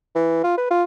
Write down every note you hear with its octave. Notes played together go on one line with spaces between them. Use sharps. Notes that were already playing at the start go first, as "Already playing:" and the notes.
E3
F4
B4
F4